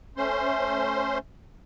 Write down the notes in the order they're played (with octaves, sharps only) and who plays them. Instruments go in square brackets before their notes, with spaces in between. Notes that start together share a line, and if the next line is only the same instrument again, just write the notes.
[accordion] A3 C#4 C5 C6